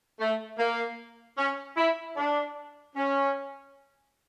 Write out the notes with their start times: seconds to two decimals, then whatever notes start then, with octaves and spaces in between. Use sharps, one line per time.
0.20 A3
0.59 A#3
1.38 C#4
1.77 E4
2.17 D4
2.96 C#4